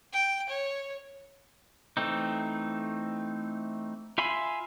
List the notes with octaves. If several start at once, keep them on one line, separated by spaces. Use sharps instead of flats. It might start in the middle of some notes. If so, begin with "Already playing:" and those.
G5
C#5
E3 A3 C4 D#4
F4 E5 G#5 B5 C6